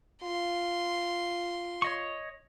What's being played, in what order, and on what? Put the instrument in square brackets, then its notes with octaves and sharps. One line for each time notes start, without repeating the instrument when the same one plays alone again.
[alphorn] F4 [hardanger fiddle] C6
[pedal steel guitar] C#5 D#5 C#6